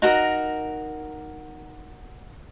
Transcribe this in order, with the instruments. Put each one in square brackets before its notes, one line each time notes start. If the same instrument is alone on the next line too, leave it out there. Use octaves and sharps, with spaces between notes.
[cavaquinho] D#4 F#4 A#4